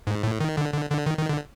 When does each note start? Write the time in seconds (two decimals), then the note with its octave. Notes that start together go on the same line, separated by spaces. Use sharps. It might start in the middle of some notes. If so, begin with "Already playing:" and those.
0.07 G#2
0.23 A2
0.40 D#3
0.57 D3
0.74 D3
0.90 D3
1.06 D#3
1.18 D#3
1.29 D3